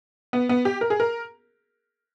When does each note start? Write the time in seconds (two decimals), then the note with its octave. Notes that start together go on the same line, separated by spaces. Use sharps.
0.33 B3
0.49 B3
0.65 G4
0.81 A#4
0.90 G#4
1.00 A#4